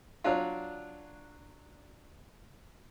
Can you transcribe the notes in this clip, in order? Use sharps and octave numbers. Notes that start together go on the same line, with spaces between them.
F#3 D4 F4